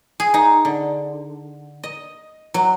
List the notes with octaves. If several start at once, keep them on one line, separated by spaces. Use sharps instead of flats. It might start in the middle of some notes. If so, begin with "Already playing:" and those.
G#4
D#4
D3
D#5
F#3